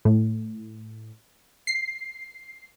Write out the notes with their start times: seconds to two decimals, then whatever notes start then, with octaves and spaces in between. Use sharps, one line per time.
0.05 A2
1.67 C7